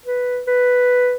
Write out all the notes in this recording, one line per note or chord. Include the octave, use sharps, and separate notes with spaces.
B4
B4